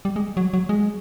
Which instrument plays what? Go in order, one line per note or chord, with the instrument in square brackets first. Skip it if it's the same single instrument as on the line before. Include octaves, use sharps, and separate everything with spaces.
[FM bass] G3
G#3
F#3
F#3
G#3